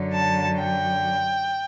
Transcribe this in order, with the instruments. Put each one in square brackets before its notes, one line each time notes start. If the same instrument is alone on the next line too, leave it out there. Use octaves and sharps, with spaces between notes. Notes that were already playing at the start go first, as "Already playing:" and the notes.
Already playing: [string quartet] F#2 D3 F#3
A5
G5